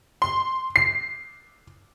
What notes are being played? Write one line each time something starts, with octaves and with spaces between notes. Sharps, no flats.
C6
C7